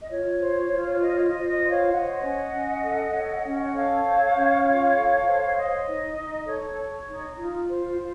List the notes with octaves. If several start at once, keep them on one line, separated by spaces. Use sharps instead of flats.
D#5
F4 C#5
C5
F4
C5 D#5
C#5
D#5
F4
D#5
C5
C#5 F5
C#5 D#5 F#5
C#4
C#4
A4
C#5
C#4
F#5
A4 C#5 F5
C5
C#4
F4
A4
C5
C#5 D#5
D#4
D#4
A4 C#5
C#5
D#4
F4
C5
F4